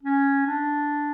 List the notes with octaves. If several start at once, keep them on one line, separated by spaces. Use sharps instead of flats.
C#4
D4